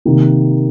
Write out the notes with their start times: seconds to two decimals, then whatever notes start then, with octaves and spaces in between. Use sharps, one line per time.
0.05 C3 D#3 A#3